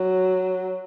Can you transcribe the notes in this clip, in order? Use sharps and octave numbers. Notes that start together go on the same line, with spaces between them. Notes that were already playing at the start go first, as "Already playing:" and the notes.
Already playing: F#3